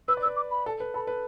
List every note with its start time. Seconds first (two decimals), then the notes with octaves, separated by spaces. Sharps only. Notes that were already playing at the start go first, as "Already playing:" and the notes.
0.08 B4 E6
0.17 D5
0.23 E6
0.26 B4
0.36 D6
0.51 B5
0.66 A4
0.80 B4
0.94 A4 B5
1.07 B4